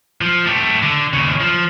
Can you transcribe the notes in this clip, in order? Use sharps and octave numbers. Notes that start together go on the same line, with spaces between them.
F3
A3 G4
D3
D#2 C#3
F3